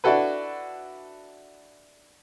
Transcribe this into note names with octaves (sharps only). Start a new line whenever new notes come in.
D4 E4 F#4 A4 B4